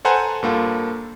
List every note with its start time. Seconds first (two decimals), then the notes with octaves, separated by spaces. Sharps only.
0.05 A4 B4 C5 F#5 G#5 A#5
0.43 G2 A#3 F4 A4